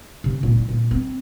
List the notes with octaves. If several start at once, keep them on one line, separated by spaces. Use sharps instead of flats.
C3
A#2
E4
A#2
C4